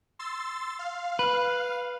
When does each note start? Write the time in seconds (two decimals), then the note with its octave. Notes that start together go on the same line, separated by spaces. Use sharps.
0.19 C6 E6 A6
0.79 F5
1.19 B4